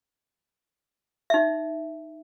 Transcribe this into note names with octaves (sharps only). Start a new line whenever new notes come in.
D#4 E5